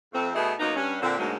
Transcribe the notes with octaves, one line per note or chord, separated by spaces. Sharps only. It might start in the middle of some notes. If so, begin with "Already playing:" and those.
F2 A3 C4
B2 A3 B3 D#4 E4 G#4
F#2 A#3 B3 D#4
G2 C#4
A#2 D3 C4
D2 G#2 B2 F#3 G#3 A#3